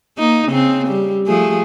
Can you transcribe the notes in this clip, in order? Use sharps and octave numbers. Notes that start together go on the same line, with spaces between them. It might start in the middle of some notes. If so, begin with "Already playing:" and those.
A#3 D#4
C#3 C4
G3
F3 A3 G#4